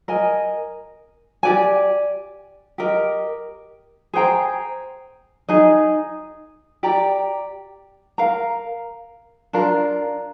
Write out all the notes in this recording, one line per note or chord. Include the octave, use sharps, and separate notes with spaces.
A#4 D#5 G#5
G4 D5 G#5
G4 A#4 D#5
G#4 C5 G5 A#5
D#4 G#4 D#5
G4 D5 G5 A#5
A#4 F5 A#5
D4 F4 A#4